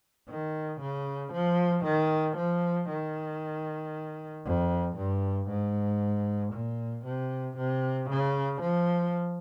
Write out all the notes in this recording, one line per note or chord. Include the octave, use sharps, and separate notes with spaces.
D#3
C#3
F3
D#3
F3
D#3
F2
G2
G#2
A#2
C3
C3
C#3
F3